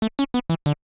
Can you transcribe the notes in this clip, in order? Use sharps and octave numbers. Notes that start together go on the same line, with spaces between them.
A3
C#4
B3
E3
D3